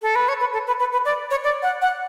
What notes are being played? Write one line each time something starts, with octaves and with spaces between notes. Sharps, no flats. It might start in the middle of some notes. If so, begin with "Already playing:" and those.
A4
B4
C#5
B4
A4
B4
B4
B4
D5
C#5
D5
F#5
F#5